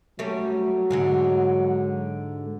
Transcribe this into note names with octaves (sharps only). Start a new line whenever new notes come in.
F#3 G3 A3 C#4
G#2 D3 G#3